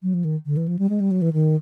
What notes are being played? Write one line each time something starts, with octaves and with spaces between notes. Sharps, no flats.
F#3
F3
D#3
D3
E3
F3
G3
G#3
G3
F#3
E3
D#3